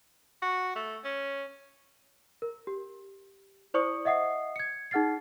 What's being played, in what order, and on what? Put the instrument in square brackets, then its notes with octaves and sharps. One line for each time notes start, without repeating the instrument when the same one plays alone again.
[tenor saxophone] F#4
A3
C#4
[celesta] A#4
G4
E4 C5 D5 C#6 D#6 C#7
D#5 E5 F#5 D#6 C7
G#6 C#7
D#4 G#4 F#5 F6 A6 C7